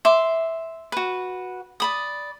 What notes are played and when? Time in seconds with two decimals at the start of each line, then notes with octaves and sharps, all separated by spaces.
0.05 E5 C6 D6
0.92 F#4 B4
1.80 D5 B5 D#6